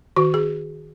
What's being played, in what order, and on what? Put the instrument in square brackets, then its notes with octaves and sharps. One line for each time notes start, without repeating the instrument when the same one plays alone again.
[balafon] D#3 F#4
G#4